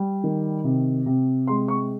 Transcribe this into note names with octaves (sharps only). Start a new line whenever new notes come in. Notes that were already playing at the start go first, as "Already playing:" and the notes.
Already playing: G3
D#3
C3
C3
G#3 C6
C#6